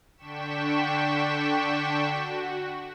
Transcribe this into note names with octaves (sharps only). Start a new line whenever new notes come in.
D3 D4 G5 C#6 B6 E7
F#4